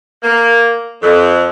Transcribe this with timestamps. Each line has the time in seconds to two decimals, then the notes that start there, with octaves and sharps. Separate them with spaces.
0.23 A#3
1.02 F2